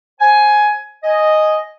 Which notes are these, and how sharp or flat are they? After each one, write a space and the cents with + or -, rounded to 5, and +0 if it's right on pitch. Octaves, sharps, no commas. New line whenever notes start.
C5 +25 G#5 +15
D#5 +0 G#5 +0